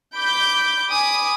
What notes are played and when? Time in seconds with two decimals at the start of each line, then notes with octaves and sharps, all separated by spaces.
0.16 B5 D6 G6
0.89 G#5 B5 D6 D#6